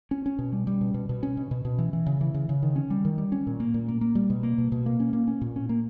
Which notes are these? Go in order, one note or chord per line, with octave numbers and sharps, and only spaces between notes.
C#4
C#4
B2
G3
G3
B2
B2
B2
C#4
B2
B2
B2
E3
E3
C#3
E3
C#3
C#3
D#3
C#4
G3
D#3
G3
C#4
A#2
A#3
A#2
A#3
A#3
G3
B2
A#3
B2
B2
A#3
C#4
A#3
C#4
A#2
C#4
A#3